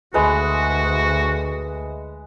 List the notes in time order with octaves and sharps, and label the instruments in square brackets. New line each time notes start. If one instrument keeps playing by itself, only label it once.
[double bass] D2 [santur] G#3 B4 [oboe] F#4